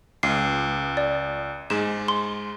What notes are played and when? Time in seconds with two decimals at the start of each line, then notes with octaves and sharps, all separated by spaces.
0.23 C#2 C7
0.97 D5
1.70 G#2 G#3 E7
2.08 C6